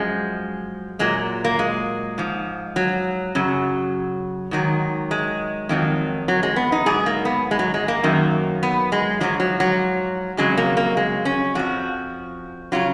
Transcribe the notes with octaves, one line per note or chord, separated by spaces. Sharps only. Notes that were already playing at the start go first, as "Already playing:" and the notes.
Already playing: F#2 F3 G#3
A#2 F#3 G#3
A#3
G#3
G#2 F3
F#3
F#2 C#3 F#3
G#2 D#3 F#3
G#3
F2 D#3 F#3
F#3
G#3
B3
D#4
G#2 F#3 G#4
A#3
B3
G#3
F#3
G#3
A#3
F#2 D#3 F#3
B3
G#3
G#2 F3 F#3
F#3
F#3
F2 C#3 F#3 G#3
A#3
A#3
G#3
C#4
F2 F3 F#4
C#3 F#3 F4